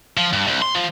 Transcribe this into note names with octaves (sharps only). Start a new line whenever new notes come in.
F3
G2
C2
C6
F3